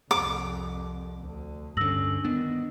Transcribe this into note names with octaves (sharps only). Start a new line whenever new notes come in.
C2 F2 D6
D2
D2 G2 D3 C#4 E6 A#6 F#7
D#3 B3 D4